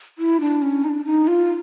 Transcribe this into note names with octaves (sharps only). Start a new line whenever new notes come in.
E4
D4
C#4
D#4
D4
D#4
F4